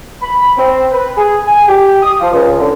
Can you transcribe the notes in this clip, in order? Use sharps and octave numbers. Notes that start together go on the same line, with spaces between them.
B5
C4
B4
G#4
G#5
G4
D#6
F3
C#2
D3